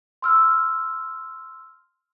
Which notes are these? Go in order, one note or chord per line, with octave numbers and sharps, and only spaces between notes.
C6 E6 F6